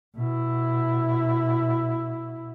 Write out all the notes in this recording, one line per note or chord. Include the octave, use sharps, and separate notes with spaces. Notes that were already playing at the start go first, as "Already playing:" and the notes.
B2 E4